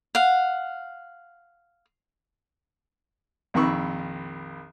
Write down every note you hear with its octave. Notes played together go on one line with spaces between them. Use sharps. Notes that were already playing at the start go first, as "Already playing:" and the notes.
F5 F#5
A#1 F2 D#3 B5 C#6 E6